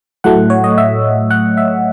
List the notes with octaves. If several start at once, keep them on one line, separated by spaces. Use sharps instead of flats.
A2 F#3 A3 F#5
C#5
D#5
E5
F#5
E5